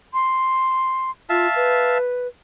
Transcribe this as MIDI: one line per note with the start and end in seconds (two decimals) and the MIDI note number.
0.14 1.11 84
1.29 1.47 65
1.29 1.98 76
1.29 1.98 77
1.29 1.98 81
1.56 2.28 71